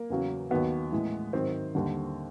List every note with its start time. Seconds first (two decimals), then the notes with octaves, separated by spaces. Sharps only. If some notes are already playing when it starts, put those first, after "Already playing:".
Already playing: A#3
0.10 E2 C#3 F#3
0.50 D#2 D#3 F#3 B3
0.92 A2 E3 G#3
1.33 G#2 D#3 F#3 C4
1.75 D#2 D3 G3